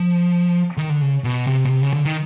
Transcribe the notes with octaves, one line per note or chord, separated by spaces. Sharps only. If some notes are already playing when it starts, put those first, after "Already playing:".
Already playing: F3
D#3
D3
C#3
B2
C3
B2
C3
C#3
D3
D#3